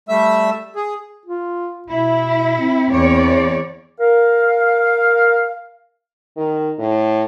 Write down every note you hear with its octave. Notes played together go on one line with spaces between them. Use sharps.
G3 A3 E5 E6
G#4
F4
B2 E4
C4
E2 C#5 D5
A#4 F5
D#3
A2